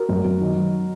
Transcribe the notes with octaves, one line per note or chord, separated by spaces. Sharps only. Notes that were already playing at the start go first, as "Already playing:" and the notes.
Already playing: F#4 A#4
F#2
F#2
D#3
F#3